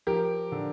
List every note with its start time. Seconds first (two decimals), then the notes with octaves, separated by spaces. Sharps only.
0.07 F3 G4 A#4
0.52 D3